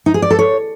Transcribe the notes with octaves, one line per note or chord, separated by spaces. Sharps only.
D#4
G#4
D5
A4
C#5